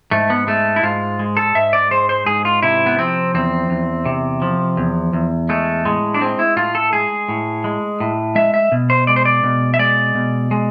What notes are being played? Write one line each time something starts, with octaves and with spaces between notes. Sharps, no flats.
G#2 A3
B3
G#3 A3
E4
G#2 F4
G#3
A4
G#2 E5
D5
G#3 C5
C5
G#2 G#4
F4
C3 E4
B3
F3 C4
E2 C4
E2
C3
F3
E2
E2
G#3 A3
A2 G#3
D4
G#3 C4
E4
A2 F4
A4
G#3 G#4
A2
G#3
A2
G#3 E5
E5
B2
C5
G#3 D5
C5
D5
B2
E5
G#3 D5
B2
G#3